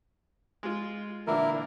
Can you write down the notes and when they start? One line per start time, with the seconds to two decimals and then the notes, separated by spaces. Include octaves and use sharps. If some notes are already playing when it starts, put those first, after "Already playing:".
0.63 G#3 F4
1.27 A#2 D3 E3 E4 A#4